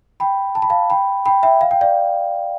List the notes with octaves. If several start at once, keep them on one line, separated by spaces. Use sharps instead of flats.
G5 B5
A5
B5
F5 A5
G5 B5
G5 B5
E5 G5
F5
G5
D5 F5